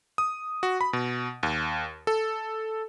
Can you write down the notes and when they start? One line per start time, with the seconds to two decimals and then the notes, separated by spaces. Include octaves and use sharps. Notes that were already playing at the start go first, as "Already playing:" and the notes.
0.18 D#6
0.63 F#4
0.81 B5
0.93 B2
1.43 D#2
2.07 A4